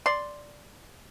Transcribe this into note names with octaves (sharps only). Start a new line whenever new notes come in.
D5 C6